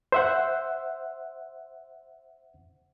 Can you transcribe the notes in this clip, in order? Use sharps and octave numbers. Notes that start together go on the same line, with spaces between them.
C5 E5 F#5